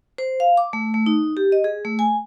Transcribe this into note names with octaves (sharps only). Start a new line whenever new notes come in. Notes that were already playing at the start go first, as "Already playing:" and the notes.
C5
F5
D6
A3
A3
D#4
G4
D#5
G#4
A3
G#5